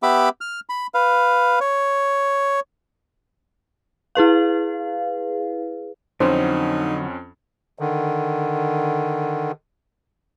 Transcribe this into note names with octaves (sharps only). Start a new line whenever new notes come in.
B3 G4 E5 B5 D6
F6
B5
B4 F5
C#5
E4 G#4 B4 F5
F2 D3 F#3 C4 C#4 D#4 C5
D3 D#3